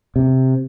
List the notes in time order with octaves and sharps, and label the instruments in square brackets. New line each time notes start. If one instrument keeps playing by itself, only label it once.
[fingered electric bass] C3